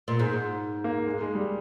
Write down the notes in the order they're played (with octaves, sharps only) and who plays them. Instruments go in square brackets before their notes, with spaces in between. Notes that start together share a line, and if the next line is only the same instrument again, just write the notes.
[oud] A#2
G#2
[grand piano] A#3
G#3
G#3
G3